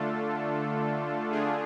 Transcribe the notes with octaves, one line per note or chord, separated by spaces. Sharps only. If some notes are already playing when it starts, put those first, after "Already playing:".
Already playing: D3 A3 D4 F4 A4
D3 A3 D4 F4 G#4